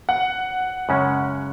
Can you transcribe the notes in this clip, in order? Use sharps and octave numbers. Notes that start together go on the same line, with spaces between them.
F#5
F#2 C#3 G#3 C#4